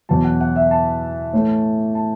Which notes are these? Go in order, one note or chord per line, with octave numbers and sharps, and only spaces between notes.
E2 B2 F#3 A5
F#5
F#5
E5
A5
A2 E3 A3
A5